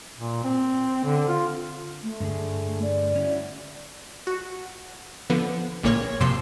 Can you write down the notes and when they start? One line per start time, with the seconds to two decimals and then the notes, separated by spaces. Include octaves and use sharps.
0.18 A#2
0.44 C4
1.04 D3
1.29 F4
2.03 A3
2.20 G2 D3 G#4
2.82 D5
3.16 C#4 E4 F#4
4.27 F#4
5.30 D3 F3 B3
5.83 A1 A#2 C#3 A#3 C#5 G#6
6.20 G#1 F2 C3 C6 E6